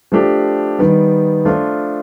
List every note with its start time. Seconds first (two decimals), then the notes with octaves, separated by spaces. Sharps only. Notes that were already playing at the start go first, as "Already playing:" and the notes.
0.12 F3 A3 D4 G4
0.79 D#3 G3 B3
1.45 F3 A3 D4 F4